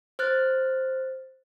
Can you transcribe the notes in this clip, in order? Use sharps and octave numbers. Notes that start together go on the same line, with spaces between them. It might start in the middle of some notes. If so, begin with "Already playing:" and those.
C5 F6 F#6 A6